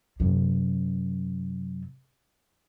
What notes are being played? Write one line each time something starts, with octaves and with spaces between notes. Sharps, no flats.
F#2 C3